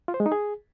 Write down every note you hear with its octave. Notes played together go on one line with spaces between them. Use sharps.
F4
C5
G#3
D#4
G#4